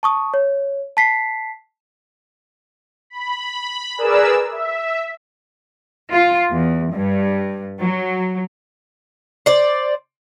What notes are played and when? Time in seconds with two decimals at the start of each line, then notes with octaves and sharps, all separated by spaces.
0.03 A5 C#6 D#6
0.34 C#5
0.97 A5 B6 C7
3.10 B5
3.97 G#4 A#4 B4 D5 E6
4.51 E5
6.11 F4
6.49 E2
6.92 G2
7.80 F#3
9.46 C5 D5